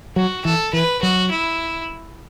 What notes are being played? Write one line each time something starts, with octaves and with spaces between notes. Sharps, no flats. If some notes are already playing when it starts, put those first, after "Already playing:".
F#3 F#4
E3 A4
E3 B4
F#3 F#4
E4